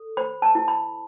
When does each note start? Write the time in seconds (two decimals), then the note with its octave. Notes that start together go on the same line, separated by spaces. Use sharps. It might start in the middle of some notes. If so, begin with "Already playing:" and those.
Already playing: A4
0.17 C5 B5
0.42 A5
0.55 E4
0.68 B5